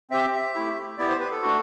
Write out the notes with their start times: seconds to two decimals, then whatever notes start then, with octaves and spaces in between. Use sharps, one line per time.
0.10 C4 G4 E5
0.33 E5
0.54 A3 E4 G4
0.98 B3 E4 G4 D5
1.09 C5
1.20 B4
1.31 A4
1.42 A3 D4 F#4